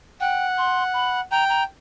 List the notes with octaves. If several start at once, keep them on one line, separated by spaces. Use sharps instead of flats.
F#5 G5
C6
B5
G5 A#5
A#5